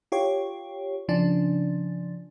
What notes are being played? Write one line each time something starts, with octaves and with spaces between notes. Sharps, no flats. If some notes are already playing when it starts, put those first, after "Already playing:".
F4 G4 C#5
C#3 F3 D4